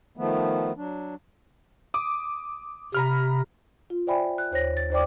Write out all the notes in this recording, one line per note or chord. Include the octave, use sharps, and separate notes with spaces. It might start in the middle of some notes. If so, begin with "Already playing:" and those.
D#3 F3 A3 B3
F#3 D4
D6 D#6
C3 A#5 B5 F6
F4
C5 D5 E5 G5 G#5 B5
F#6
D#2 C5 C#5 A#6
A6
D#2 C5 D5 G5 D6